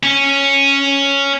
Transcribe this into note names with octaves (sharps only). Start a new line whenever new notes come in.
C#4